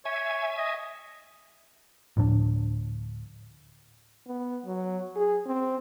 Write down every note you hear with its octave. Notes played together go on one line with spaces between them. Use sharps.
C#5 E5 G#5
D#5
D2 A2 F3 D4
B3
F#3
G#4
C4